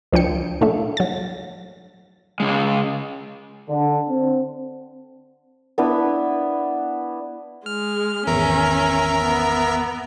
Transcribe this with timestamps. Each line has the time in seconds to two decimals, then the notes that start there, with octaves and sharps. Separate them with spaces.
0.12 C#2 F3 D4 G5 C#7
0.61 A#2 A3 D4 E5
0.97 F#3 A6
2.40 C#3 G#3
3.69 D3
4.10 C4
5.78 B3 D4 E4 B4
7.66 G#3 F6
8.27 G#1 E2 C#4 A#4 E5 A#5
9.25 B3